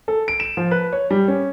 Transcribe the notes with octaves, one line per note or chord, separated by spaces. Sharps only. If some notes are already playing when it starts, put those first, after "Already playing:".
A4
D7
E7
F3
B4
C#5
G3
C#4